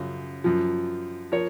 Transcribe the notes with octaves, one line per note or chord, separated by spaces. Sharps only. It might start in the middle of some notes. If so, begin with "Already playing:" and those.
Already playing: F#2 C#3 F3
F#2 F3
F3 A#4 C#5